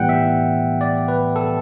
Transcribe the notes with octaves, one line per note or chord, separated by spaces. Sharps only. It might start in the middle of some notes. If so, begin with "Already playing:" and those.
Already playing: A2 E3 G3 B3 F#5 G5
E5
D5
B4
A4